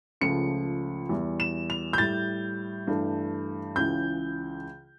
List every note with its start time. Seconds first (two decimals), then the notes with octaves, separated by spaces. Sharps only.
0.21 C#2 C#3 F3 A3 C#7
1.09 E2 E3 G3
1.40 E7
1.70 F7
1.93 G6
1.98 A2 G3 A6
2.87 G2 E3 A3
3.76 C#2 C#3 E3 G6